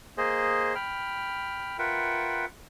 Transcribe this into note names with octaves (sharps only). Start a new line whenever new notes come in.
A#3 G#4 C5 D#5
G5 B5 F6
F4 A#4 B4 E5 F#5 G5